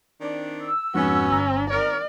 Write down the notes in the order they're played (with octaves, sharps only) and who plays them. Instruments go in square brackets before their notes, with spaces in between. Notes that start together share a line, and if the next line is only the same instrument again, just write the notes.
[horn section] D#3 C4 D4
[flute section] E6
[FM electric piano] F2 G#2 [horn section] B3 F#4 [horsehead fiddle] C#4
[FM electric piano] G1 A#5
[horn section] D#3 C4 A#4 [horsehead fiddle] D5